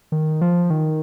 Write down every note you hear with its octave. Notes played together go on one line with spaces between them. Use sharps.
D#3
F3
D#3